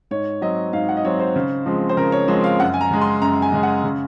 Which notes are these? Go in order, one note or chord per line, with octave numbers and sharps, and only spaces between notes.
G#2 C#5
F#3 C4 D#5
G#2 F5
F#5
D#5
F#3 C4 C#5
C5
C#3
F3 G#3 C4
C5
C#3 A#4
C#5
F3 G#3 C4
F5
F#2 F#5
G#5
A#5
C#3 G#3
C6
F#2 A#5
G#5
C#3 G#3
F#5
C#3